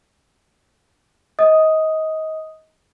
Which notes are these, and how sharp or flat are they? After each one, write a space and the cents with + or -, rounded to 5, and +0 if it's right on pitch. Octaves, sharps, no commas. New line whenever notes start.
D#5 +25 D#6 +0